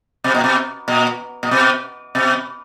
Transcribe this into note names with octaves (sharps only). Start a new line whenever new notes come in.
B2
A#2
B2
A#2
A#2
B2
B2